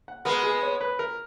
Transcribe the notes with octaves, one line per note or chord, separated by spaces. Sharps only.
F#5
G#3 B3 A#4
G#4
C#5
B4
A#4